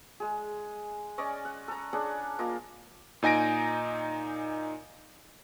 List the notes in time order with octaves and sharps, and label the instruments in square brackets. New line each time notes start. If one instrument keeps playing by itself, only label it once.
[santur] G#3 G#4
C#4 D5 D#5 C#6
F#5
A4 A#5
C#4 D4 G#4 F#5
A#3 F4 D#5
[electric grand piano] A#2 D#4 G#5 A#6 D7